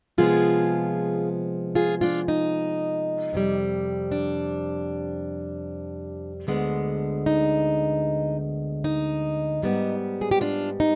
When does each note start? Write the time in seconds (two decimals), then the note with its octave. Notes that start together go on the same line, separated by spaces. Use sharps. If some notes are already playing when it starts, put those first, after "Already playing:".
0.18 C3 F3 G#3 B3 F4 G#4
1.75 F4 G#4
2.01 D4 F4
2.28 D#4
3.33 F2 C3 G3
4.12 D4
6.47 D2 D3 G#3 B3
7.26 D#4
8.84 D#4
9.62 G#2 G3 B3
10.21 G#4
10.31 G4
10.41 D4 F4
10.80 D#4